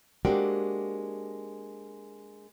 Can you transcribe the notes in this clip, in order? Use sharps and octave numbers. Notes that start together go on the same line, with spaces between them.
G#3 A#3 C4 D4 F#4 G4